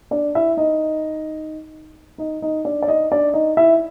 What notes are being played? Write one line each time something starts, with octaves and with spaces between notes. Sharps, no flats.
D4 D5
E4 E5
D#4 D#5
D#4 D#5
D#4 D#5
D4 D5
D5
D#4 D#5
D4 D5
D#4 D#5
E4 E5